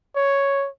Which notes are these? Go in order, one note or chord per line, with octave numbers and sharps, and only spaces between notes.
C#5